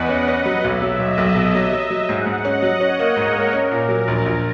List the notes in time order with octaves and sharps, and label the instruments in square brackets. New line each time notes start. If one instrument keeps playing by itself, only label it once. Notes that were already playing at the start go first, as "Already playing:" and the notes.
Already playing: [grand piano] E2 [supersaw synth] B4 D#5 F#5
[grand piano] C#4
C#4
F#3
[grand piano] B1 [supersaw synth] E5
[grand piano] F#3
[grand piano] B1 [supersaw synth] D#5
[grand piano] B1
[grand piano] B2 [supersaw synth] E5
[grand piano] F#3
F#3
F#3
[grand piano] G#2 [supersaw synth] F#5
[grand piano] G#2
[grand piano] C#4 [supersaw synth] D#5
[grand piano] F#3
[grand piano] C#4 [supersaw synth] C#5
[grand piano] A#3
[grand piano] G#2 [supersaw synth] A#4
[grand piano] A#3
[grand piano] C#4 [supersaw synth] A#4
[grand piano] A#2
F#3
A#1
A#1